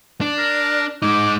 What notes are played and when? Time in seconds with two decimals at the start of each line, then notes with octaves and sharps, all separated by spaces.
0.21 D4
0.38 A#4
1.02 G#3 D#4 D6